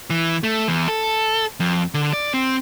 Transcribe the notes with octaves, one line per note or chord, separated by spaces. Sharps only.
E3
A3
E2
A4
F2
D3
D5
C4